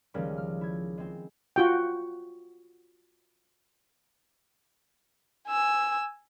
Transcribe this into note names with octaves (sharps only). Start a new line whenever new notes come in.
C#2 D#3 F3 G3 G#3 A#3
F6
E4 G#6
G#3 C4
F4 F#4 G5
G#5 E6